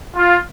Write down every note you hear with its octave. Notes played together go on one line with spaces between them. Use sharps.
F4